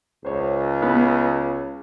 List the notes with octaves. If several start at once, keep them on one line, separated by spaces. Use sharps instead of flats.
C#2 C5 C#5
B3